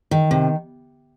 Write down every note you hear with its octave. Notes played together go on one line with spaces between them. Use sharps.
D#3
C3